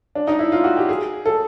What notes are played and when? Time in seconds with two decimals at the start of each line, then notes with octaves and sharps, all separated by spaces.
0.15 D4
0.27 D#4
0.39 E4
0.52 F4
0.64 F#4
0.77 G4
0.89 G#4
1.26 A4